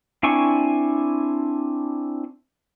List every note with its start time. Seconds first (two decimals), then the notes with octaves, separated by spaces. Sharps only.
0.23 C4 D4 E4 G#5 C#6